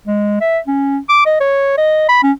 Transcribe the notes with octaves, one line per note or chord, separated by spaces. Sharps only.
G#3
E5
C#4
D6
D#5
C#5
D#5
B5
C#4